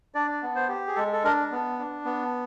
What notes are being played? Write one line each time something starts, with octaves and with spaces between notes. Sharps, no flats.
D4 D5
B3
C5
G4
G#4
G#3 A4
A4
D4 A#4
B3
D4
B3